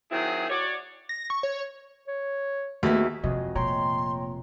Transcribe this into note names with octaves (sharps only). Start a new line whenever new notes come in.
D#3 F#3 C4 E4 G4 G#4
F#4 C#5 D5
A#6
C#6
C#5
C#5
D#2 A3 B3 F#4 G#4 E5
F1 F2 C3 G#3 F#4 D#5
A#2 C#5 G5 A#5 C6